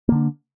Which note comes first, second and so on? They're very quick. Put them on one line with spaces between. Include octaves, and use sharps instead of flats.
A#3 D3 D4